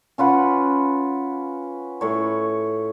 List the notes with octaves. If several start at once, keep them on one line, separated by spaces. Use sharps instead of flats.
C#4 F4 B4 F#5
A2 C#5